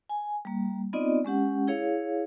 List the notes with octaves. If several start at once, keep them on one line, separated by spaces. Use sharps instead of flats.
G#5
G3 A#3
B3 C4 D#4 F4 D5 D#5
G#3 C#4 G4 F#5
E4 G#4 C#5 F5